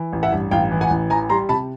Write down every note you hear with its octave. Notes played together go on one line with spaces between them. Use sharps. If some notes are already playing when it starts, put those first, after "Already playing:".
Already playing: E3
A1
E5 F#5
G2
A1 F5 G5
E3
F#5 G#5
A1
E3 G#5 A#5
G3 A#5 C6
C3 A5 B5